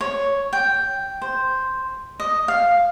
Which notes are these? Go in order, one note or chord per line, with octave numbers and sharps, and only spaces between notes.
C#5
G5
C5
D#5
F5